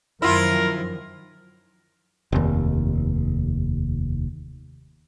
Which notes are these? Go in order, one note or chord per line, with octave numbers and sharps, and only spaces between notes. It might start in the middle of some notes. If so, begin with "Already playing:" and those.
F#2 D#3 F3 E4 F4 A#4
F1 D#2